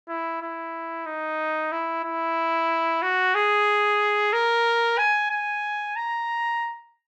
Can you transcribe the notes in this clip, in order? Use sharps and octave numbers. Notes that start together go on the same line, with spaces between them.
E4
E4
D#4
E4
E4
F#4
G#4
A#4
G#5
G#5
A#5